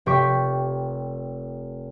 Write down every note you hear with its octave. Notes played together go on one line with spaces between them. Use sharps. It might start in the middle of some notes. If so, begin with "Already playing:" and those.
F1 G4 G5 C#6 B6